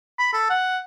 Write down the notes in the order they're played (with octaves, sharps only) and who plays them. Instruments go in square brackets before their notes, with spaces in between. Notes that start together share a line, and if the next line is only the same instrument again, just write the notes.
[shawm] B5
A4
F#5